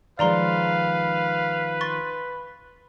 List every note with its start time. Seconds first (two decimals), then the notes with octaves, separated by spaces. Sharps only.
0.19 D#3 F3 G#3 B4 D5 F5 A#5 C6
1.81 C6 C#6 A6